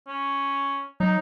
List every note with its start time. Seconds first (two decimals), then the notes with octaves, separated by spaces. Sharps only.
0.08 C#4
1.00 F#3 D#4